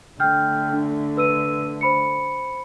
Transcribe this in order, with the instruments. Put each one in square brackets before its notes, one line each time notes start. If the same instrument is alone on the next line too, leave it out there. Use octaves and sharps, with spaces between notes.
[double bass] D3 A3 [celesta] G5 F6 G6
[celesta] D4
B4 E6 D#7
C5 B5 C#7